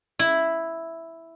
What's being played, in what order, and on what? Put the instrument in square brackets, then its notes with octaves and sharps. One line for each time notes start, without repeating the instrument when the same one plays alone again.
[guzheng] E4